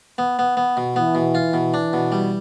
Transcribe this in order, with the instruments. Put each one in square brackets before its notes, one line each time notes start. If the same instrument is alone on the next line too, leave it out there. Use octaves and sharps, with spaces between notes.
[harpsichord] B3
B3
B3
B2
[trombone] E3 [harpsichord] B3
[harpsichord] B2
F4
B2
D4
B2
G3